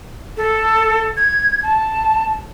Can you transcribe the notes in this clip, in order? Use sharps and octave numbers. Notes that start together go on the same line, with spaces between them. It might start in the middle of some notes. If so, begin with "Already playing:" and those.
A4
G#6
A5